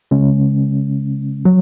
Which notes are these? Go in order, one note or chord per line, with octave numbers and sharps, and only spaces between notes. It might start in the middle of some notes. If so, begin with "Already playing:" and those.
C#3 G#3 C#4
F#3